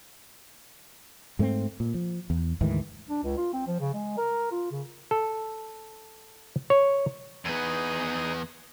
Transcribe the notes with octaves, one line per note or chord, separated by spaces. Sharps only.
G#2 A3 B3 C4
A#2
F3
E2
D2 G#2 D#3 E3
D4
C#2
F4
C4
F3
C#3
G#3
A#4
F4
C#3
A4
C#5
E2 B3 D#4 G#4 D#6